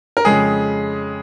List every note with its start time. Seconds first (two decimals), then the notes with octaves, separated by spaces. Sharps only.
0.17 A#4
0.25 F2 C#3 G#3 G#4